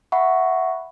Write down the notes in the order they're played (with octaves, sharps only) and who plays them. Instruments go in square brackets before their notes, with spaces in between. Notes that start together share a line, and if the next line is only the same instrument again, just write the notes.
[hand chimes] E5 F#5 B5 C#6